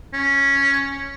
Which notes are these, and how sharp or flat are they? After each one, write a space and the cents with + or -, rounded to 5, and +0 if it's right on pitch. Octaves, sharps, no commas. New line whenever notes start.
C#4 +0